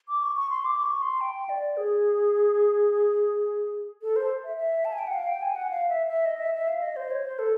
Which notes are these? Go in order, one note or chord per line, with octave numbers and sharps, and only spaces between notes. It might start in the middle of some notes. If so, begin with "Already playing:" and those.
D6
C#6
C#6
C6
D6
C#6
C6
G5
D5
G#4
A4
C5
E5
E5
A5
G#5
G5
F#5
F5
G5
G#5
F#5
F5
E5
E5
D#5
E5
E5
F5
D#5
C5
C#5
C5
A4